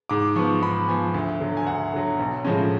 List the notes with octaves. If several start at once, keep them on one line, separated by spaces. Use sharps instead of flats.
G#2 D6
F3 B3 C#6
G#2 B5
F3 B3 G#5
D2
D3 F#3
G#5
D2 F#5
D3 F#3
B1
A2 F3 G#3 C#4